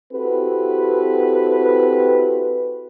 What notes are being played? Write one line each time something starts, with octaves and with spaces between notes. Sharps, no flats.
C4 E4 F#4 G4 A4 B4